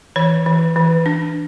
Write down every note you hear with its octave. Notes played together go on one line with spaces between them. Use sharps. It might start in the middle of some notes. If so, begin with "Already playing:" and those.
E3 C#5
E3
E3
D4